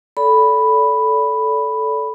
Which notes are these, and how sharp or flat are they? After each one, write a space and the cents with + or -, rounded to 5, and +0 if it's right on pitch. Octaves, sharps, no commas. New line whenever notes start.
A4 -10 D5 -30 B5 +0